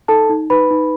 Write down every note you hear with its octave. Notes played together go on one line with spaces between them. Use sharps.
D#4 A4 A5
D#4
D#4 B4 B5
D#4